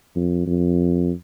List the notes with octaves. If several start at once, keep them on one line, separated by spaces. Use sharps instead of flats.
F2
F2